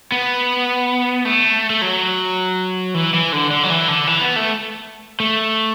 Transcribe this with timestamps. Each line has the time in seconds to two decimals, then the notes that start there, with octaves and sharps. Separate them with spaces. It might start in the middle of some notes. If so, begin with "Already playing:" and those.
0.12 B3
1.25 A3
1.70 A3
1.82 F#3
2.94 E3
3.14 E3
3.33 D3
3.51 D3
3.63 F#3
3.70 E3
3.88 D3
4.07 E3
4.21 B3
4.36 A3
5.20 A3